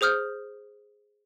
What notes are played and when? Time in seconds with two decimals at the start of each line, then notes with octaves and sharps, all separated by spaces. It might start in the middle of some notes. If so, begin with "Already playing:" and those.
0.01 G#4 C5 D#6 F6 G6